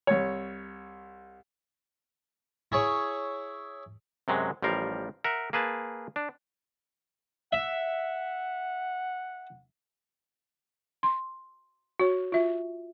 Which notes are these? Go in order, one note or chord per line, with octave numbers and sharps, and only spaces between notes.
C2 C#5
E4 G#4 C#5
F#2 C3 F#3 G#3
A1 F3 G3 A#4 F5
A#4 E5 F#5
A#3 G#4 B4 A5
D4
E5 F#5
C6
F#4 C#5
F4 E5